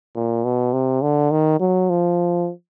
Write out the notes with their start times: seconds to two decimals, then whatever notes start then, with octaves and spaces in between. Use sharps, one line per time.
0.15 A#2
0.45 B2
0.73 C3
1.02 D3
1.31 D#3
1.60 F#3
1.90 F3